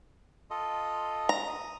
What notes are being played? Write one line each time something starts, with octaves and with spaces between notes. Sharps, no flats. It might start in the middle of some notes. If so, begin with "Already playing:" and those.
F4 A4 D#5
A#5
D#6